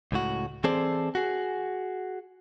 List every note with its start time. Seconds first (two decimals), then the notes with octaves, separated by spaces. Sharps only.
0.12 C#2 A2 F#4
0.64 E3 C4 G#4 A4 C5 D5
1.15 F#4 G#4